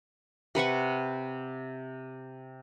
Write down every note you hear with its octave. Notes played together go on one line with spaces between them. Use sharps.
C3 B4 F#5 C#6